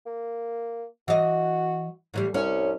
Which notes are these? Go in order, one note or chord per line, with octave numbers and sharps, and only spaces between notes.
A#3
E3 F#4 D#5
A2 E3 G3
C2 C#4